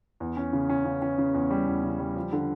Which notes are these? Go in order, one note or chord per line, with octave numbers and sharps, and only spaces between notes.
E2
C#4
C#3
C#4
C#3
C#4
C#3
E2
G3
E2
C#3
G3
F3
D3